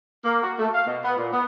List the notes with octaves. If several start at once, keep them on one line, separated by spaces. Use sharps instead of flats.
A#3
F#4
A3
F5
B2
B3
A#2
B3